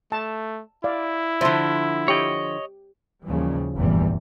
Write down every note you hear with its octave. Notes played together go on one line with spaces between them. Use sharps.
A3 A5
E4 D5 F5
D3 F3 C5 E5 C6
G4 C#5 D#5 G5
D#2 A#2 C#3 E3 F3 G3
F1 A#1 E2 G2 E3 G3